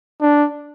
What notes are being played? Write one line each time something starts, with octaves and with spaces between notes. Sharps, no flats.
D4